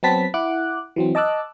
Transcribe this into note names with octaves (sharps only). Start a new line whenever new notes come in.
F#3 B3 C4 B4 A5 B6
E4 F#5 D6 F#6
E3 F#3 C4
D#5 A5 D6 E6 F#6